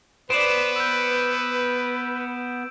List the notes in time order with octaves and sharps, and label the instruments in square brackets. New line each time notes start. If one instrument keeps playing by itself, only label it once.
[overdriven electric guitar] B3 [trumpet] B4 [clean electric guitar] C5 D5 [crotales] D7 E7
[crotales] E6 G6